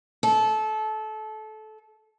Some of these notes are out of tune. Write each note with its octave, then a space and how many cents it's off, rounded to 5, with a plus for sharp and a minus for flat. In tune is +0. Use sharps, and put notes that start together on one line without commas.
A4 -25